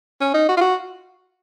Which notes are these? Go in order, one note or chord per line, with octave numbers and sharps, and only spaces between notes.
C#4
D#4
F#4
F4
F#4